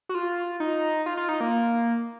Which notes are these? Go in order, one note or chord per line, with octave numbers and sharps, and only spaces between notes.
F#4
F4
D#4
F4
F4
D#4
A#3